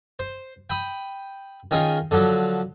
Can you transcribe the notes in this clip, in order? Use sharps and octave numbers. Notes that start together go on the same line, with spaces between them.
C5
G5 B5 D#6
D#3 C#4 D#4 F4 G#4 A#4
D3 F3 F#3